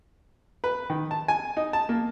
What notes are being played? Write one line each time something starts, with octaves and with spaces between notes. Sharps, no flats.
B4
D#3
A5
G#5
D#4
A5
A#3